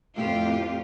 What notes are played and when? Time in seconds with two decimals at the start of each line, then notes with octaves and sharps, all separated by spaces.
0.16 F2 A2 A3 F4 G4